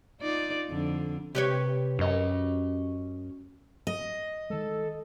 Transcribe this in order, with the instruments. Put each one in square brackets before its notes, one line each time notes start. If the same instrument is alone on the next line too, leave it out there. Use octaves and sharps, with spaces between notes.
[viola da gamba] D#4 F4 D5
F2 D3
[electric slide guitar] C3 [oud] G4 B4 C#5
[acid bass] F#2 [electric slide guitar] C#4 D#5
[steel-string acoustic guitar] D#5
[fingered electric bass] D#3 G#3 [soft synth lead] A4